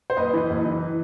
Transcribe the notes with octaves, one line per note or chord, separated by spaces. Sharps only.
C5
F#1 B4 D#5
E3
F#1
E3